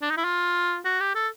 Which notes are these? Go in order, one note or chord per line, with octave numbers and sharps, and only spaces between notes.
D4
D#4
E4
F4
F#4
G4
A4